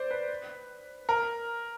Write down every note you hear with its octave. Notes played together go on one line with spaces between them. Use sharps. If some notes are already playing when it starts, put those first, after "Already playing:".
Already playing: C5 D5
B4
A#4